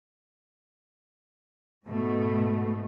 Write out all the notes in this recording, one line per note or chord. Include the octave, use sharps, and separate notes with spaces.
G#2 B2 A3